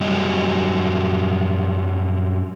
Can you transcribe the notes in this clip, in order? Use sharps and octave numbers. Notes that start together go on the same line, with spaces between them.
F#2 F#3 G3 G4 D#5